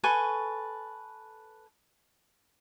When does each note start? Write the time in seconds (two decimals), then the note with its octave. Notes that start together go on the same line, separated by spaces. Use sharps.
0.04 A4 B4 G#5 C#6